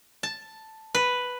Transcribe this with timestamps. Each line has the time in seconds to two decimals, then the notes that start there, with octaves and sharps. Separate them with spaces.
0.23 A5
0.95 B4